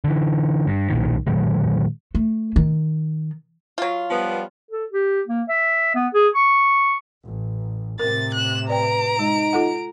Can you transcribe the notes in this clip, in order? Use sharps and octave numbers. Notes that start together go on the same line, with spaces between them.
D3 E3
G2
B1 A#2 D#3
A#2 D#3 F#3 G#3
A3
D#3
F#3 F4
F3 G3 B3
A4
G4
A#3
E5
B3
G#4
C#6
A1
A2 C3 A#4 A6
F#6 E7
B4 D5 G5 A#5 D7
G#3 D#4
F4 A4 F#5